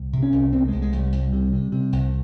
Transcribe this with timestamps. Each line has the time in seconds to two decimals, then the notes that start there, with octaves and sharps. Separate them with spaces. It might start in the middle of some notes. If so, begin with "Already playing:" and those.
Already playing: C2
0.13 C3
0.23 C#4
0.32 C2
0.52 C3 C4
0.68 C2 G#3
0.82 G#3
0.93 C2
0.98 G3
1.12 C2
1.33 C3
1.53 C3
1.72 C3
1.93 C2